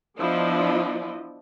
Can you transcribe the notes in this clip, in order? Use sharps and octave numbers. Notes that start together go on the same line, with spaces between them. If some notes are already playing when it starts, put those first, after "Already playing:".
F3 B3 D4 E4 D#5